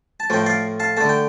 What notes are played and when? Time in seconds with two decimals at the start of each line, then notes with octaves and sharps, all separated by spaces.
0.20 A5
0.30 A2 F3 A3 G5
0.46 D5 F5
0.80 F5 A5
0.97 D3 A3 A5
1.09 G5